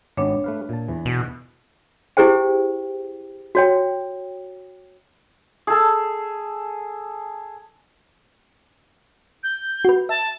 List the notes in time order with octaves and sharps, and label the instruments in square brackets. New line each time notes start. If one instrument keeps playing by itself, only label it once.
[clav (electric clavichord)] G#1 B3 [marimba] D4 C#5
[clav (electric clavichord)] A3 B4 F5
A#2 A5
E2 E3
[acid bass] B2
[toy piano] E4 G4 G#4 C5 G5
F#4 C#5 G5
[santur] G#4 A4
[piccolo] G6
[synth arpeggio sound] F#4 B4
[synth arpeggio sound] E5 [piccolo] A5